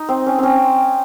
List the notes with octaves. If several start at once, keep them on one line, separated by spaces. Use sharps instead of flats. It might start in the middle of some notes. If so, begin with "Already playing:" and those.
Already playing: D#4
C4
C#4
C4 C#4